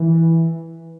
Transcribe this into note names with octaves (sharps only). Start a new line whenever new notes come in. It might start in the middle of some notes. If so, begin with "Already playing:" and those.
Already playing: E3